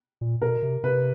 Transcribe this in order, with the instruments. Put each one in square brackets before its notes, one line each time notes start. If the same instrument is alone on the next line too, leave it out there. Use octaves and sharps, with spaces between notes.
[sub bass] A#2
[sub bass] B2 [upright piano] A#4
[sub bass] C3
[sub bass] C3 [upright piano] B4